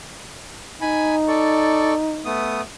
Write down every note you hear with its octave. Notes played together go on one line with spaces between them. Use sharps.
D#4 G#5 B5
A4 D5 C#6
A3 B3 D#6